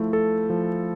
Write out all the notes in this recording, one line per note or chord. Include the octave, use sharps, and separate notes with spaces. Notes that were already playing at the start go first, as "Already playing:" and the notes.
Already playing: F3 A3 E4
A4
F3